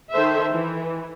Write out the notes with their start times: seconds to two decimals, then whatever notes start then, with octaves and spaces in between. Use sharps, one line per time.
0.12 D#3 A4 C5 E5
0.51 E3